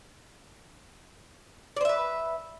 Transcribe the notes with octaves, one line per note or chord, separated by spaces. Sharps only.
B4 C5 D5 E5